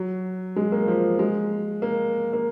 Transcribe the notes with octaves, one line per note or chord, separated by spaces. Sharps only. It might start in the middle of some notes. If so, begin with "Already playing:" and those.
Already playing: F#3
G#3
A#3
F3
G#3
A#3
A#3